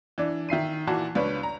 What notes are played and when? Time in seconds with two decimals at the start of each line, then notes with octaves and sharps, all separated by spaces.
0.18 E3 D4
0.49 D#3 E5 C7 D#7
0.87 A#2 E3 F#4 A5
1.15 C#2 D4 B4 C#5
1.43 A#5